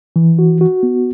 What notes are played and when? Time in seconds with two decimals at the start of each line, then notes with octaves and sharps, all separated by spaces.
0.16 E3
0.39 F#4
0.61 F#4
0.83 B3